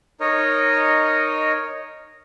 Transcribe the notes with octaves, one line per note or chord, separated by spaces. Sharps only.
D#4 A#4 C#5 D#5